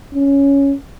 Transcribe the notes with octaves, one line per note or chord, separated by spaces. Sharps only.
C#4